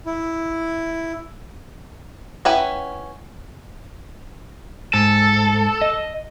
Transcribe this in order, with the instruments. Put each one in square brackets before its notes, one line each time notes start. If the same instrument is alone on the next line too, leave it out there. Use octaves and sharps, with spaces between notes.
[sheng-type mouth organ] E4
[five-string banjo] C#4 E4 B4 F#5 G5
[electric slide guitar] G#2 [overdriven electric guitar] A4
[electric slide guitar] D#5